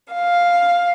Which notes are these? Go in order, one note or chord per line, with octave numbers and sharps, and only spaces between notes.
F5